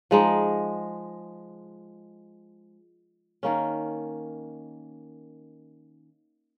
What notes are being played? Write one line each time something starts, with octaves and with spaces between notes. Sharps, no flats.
F3 G#3 D#4
D#3 A#3 C#4